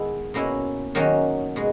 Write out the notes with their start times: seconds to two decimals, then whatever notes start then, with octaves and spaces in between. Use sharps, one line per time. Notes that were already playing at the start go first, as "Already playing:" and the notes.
Already playing: D#3 G#3 B3 E4
0.34 B2 A#3 C#4 E4
0.95 D#3 F#3 A#3 C#4
1.56 B2 G#3